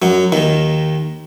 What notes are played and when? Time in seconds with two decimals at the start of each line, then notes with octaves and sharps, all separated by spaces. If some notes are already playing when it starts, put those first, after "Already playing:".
0.02 F#2 F#3
0.32 D#2 D#3